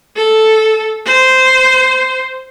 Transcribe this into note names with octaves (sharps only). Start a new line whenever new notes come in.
A4
C5